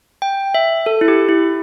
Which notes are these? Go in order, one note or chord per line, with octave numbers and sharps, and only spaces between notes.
G5
E5
A4
E4
G4
E4